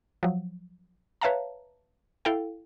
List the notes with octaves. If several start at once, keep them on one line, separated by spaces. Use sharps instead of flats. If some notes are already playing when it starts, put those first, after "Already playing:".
F3 F#3
B4 C#5 E5 F5 A5 A#5
E4 A4 F5 G5